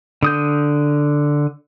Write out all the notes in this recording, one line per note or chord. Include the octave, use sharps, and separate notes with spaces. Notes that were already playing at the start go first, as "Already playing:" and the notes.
D3 D#6 G6